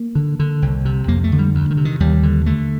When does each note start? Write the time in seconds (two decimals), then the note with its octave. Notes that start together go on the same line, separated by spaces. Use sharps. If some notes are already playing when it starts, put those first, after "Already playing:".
Already playing: A#3
0.15 D3
0.39 D3
0.62 C2
0.85 C3
1.08 F2 A#3
1.24 A3
1.32 D3
1.38 G3
1.55 D2
1.70 D#3
1.77 C3
1.85 D#3
2.00 D#2 G3
2.23 D3
2.46 D3 A3